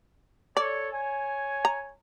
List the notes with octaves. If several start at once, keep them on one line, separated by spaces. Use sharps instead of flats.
A4 C#5 D5
C#5 G#5
A#5